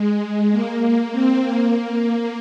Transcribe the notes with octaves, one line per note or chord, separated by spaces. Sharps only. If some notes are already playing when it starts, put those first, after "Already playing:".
Already playing: G#3
A#3
A#3
C4
A#3